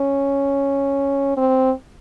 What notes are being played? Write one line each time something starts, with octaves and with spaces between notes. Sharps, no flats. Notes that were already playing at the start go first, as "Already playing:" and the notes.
Already playing: C#4
C4